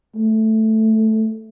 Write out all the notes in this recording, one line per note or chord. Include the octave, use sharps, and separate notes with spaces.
A3